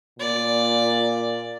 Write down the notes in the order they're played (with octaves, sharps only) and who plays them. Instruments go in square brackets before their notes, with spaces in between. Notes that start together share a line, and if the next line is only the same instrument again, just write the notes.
[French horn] A#2 [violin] D5